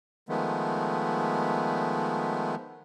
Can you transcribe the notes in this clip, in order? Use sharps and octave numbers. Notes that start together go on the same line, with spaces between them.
D#3 F3 G#3 A3 B3